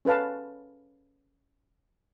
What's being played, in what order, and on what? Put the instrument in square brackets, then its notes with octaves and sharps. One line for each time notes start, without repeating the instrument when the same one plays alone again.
[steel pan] C#4 A4 B4 F5 A5